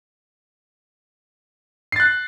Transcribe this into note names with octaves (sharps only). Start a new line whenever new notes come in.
F#6 A6 C7